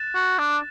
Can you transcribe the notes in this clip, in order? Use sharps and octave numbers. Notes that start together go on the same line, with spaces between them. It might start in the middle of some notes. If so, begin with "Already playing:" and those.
Already playing: F#6 A6 E7
F#4
D4